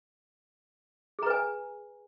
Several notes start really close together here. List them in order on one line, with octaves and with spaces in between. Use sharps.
G#4 A#5 B4 G#5